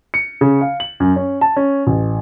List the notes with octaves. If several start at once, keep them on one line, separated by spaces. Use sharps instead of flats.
C#7
C#3
F5
F#7
F#2
C#4
A5
C#4
A1